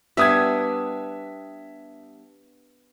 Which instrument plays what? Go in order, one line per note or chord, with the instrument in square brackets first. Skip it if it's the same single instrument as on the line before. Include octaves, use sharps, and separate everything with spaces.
[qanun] G3 B3 D4 [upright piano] E5 D#6 G#6